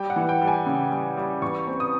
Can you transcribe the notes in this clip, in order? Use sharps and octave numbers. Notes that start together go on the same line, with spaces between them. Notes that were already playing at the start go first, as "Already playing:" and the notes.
Already playing: G3 G5
F#5
E3
G5
G3
G#5
C#3
G3
G3
E2 C#6
C4
D#6